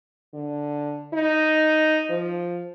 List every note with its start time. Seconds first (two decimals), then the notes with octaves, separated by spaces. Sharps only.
0.34 D3
1.13 D#4
2.09 F3